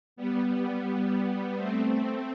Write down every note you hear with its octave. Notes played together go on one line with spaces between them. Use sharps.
G3 B3
G3 B3
A3 C4